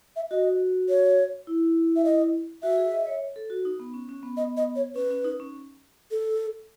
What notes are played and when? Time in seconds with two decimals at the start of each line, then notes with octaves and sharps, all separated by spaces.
0.16 E5
0.31 F#4 D#5
0.89 C#5
1.47 E4
1.96 E5
2.05 D#5
2.63 F#4 E5
2.78 G#4
2.92 D#5
3.07 C#5
3.36 A4
3.50 F#4
3.65 D#4
3.80 B3
3.94 C#4
4.09 C#4
4.23 B3
4.37 D#5
4.57 D#5
4.76 C#5
4.95 C#4 B4
5.10 C#4
5.24 D#4
5.40 C#4
6.11 A4